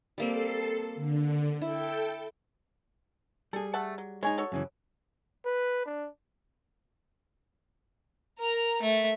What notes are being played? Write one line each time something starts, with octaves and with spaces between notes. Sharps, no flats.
G3 A#3 C4 A4 C7
D3
E4 A4 G5
G3 G#4 A4
A3 F#5 A5
F#3
G#3 D#4 C#5 G#5
F#4 A4 C#5
F#2 C#3 E3
B4
D4
A#4 A#5
A3 E5